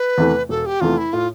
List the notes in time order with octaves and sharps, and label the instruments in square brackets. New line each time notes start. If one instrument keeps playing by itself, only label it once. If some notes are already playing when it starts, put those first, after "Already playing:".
Already playing: [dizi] B4
[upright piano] E2 C3 E3 A3
[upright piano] E1 [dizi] A4
[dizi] G4
[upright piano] E2 C3 E3 A3 [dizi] F4
[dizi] E4
[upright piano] A2 [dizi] F4